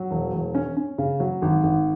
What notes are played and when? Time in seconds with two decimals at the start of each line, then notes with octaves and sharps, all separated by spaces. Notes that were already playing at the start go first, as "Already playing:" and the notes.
Already playing: F#3
0.11 E1
0.33 E1
0.55 C#4
0.77 C#4
0.98 C#3
1.20 F#3
1.42 G#1
1.64 G#1